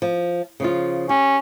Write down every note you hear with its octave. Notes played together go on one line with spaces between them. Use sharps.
F3
C#3 F3 F4
C#4 G4